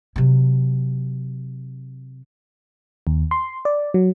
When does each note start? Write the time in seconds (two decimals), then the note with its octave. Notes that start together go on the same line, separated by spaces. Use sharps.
0.16 C3 F#3
3.07 D#2
3.31 C6
3.65 D5
3.94 F#3